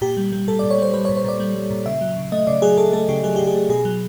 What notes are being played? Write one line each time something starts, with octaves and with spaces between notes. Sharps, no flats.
A#2 G4
G3
G3
A#2 A4
D5
A#2
C#5
G3 C5
G3 B4
C#5
A#2
C5
A#2 D5
G3
G3
A#2
C#3 E5
F#3
C#3
A3 D#5
C#3 D5
F#3 G#4
C#3 A4
A3 A4
C#3 G4
F#3 G#4
C#3 G4
G#4
A3
B2 G#4
F#3